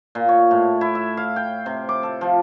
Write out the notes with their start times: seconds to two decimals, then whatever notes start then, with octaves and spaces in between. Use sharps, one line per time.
0.15 A#2
0.29 C#5
0.51 A2
0.81 E4
0.95 E5
1.17 F5
1.36 G5
1.66 C3
1.89 D6
2.03 A4
2.21 F3